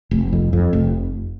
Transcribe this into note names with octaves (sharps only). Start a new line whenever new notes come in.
F1
F2
F2
F1